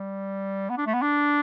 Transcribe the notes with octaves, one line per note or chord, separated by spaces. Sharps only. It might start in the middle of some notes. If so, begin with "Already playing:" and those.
Already playing: G3
B3
D4
A3
B3
D4